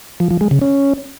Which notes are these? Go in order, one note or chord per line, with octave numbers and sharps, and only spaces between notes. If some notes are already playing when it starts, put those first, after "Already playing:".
F3
F3
G#3
C#3
C#4